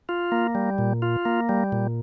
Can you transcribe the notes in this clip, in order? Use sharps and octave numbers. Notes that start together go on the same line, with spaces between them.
F4
A#3
G3
A#2
F4
A#3
G3
A#2